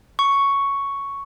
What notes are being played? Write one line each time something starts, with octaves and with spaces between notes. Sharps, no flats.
C#6